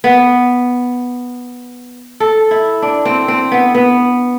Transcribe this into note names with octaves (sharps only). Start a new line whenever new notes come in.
B3
A4
E4
D4
C4
C4
B3
B3